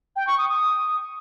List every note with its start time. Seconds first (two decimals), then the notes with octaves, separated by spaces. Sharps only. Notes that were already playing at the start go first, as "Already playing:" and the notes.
0.16 G5
0.27 C#6
0.38 D#6
0.49 D#6